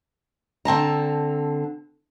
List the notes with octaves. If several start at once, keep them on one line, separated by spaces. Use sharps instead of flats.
D3 C4 A5 A#5